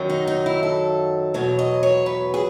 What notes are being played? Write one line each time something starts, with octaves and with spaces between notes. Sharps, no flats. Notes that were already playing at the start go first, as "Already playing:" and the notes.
Already playing: F#2 D#3 F#3
D#4
D#4
E4
A4
E2 B2 F#3 C#5
D#5
C#5
B4
G#4